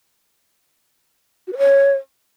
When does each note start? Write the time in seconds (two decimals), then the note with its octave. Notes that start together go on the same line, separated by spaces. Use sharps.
1.47 F#4
1.53 B4
1.58 C#5